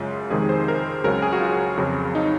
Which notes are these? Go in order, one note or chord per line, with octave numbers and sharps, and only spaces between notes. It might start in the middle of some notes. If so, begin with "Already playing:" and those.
Already playing: F#2 C#3 G#3 F4
F2 C3 D#3 G#3 G#4
C5
A#4
C#2 C#3 F#3 A#4
G#4
F#4
F4
F2 C#3 F#3
D#4